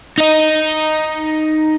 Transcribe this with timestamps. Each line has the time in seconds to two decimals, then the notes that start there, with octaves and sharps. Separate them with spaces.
0.18 D#4 D#5